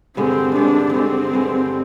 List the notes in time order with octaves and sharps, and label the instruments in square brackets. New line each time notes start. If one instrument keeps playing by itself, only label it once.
[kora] G2 D3 G#3 [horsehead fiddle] C4
[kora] G2 D3 G#3 [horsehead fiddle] D4
[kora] G2 D3 G#3 [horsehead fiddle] C4
[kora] G2 D3 G#3